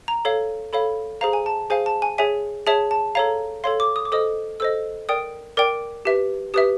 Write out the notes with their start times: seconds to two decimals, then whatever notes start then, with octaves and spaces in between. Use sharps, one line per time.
0.08 A#5
0.25 A4 C#5 F5
0.73 A4 C#5 F5 B5
1.21 G#4 C5 F5 A#5
1.33 G#5
1.46 A5
1.70 G#4 C5 F5 G#5
1.86 A5
2.02 G#5
2.18 G#4 C#5 E5 G#5
2.66 G#4 C#5 E5 A5
2.91 A5
3.15 A4 C#5 F5 A#5
3.64 A4 C#5 F5 C6
3.80 D6
3.96 D#6
4.05 D6
4.12 A4 C5 D#5 D#6
4.60 A4 C5 D#5 E6
5.09 A#4 D5 G5 D#6
5.57 A#4 D5 G5 D6
6.05 G4 B4 E5
6.54 G4 B4 E5 D#6